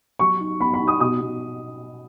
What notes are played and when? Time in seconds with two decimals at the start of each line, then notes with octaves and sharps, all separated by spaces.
0.19 F#3 C#6
0.40 D#4
0.60 B3 B5
0.74 B5
0.80 D#4
0.88 D#6
1.00 B2 D#6
1.21 B2